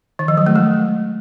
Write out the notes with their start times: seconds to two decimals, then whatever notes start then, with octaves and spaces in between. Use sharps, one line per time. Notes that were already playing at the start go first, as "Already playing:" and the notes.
0.19 D#3
0.28 F3
0.37 F#3
0.46 A3
0.56 G#3